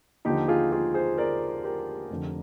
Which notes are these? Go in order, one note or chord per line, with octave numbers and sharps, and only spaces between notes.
D#2 D3 F3 D#4 G4
F4 G#4
F4 G#4
G#4 C5
A#4 D5
G4 A#4
F1 F2 D3